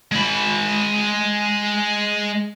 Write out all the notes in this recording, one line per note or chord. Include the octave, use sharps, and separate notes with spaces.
G#3 B5